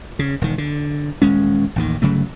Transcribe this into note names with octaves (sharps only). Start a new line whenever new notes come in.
C#3
E1 D#3
D3
D#1 G#3 C#4
A1 D#2 D#3
G1 C#3 F#3 A3